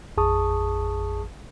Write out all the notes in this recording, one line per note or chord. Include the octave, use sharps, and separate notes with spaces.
A1 F2 G#4 A5 C#6 D#6